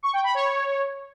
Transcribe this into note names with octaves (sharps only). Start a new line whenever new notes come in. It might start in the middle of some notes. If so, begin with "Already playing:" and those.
C#6
G5
B5
C#5